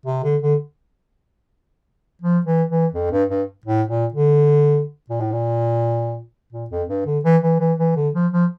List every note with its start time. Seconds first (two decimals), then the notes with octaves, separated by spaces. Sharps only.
0.06 C3
0.24 D3
0.42 D3
2.22 F3
2.46 E3
2.70 E3
2.94 F2
3.12 G2
3.30 G2
3.66 A2
3.89 A#2
4.14 D3
5.10 A#2
5.21 A2
5.32 A#2
6.53 A#2
6.71 F2
6.89 G2
7.06 D3
7.25 E3
7.43 E3
7.60 E3
7.79 E3
7.96 D3
8.14 F3
8.33 F3